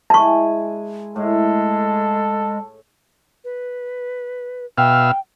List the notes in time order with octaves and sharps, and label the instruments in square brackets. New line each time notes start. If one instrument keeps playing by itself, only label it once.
[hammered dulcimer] G#3 E4 G#5 [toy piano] A5 C#6
[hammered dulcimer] A2 [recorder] G#3 [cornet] A4
[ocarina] B4
[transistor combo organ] B2 E5 F5 [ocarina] G5